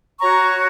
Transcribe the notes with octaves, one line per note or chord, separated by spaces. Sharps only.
F#4 C#5 A#5 C#6